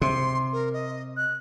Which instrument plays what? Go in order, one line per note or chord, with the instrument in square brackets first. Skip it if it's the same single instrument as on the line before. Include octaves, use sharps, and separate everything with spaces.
[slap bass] C3 [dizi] C6
[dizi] A#4
D#5
F#6